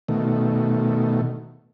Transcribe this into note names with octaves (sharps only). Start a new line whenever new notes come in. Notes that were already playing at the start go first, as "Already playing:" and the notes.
B2 D#3 A3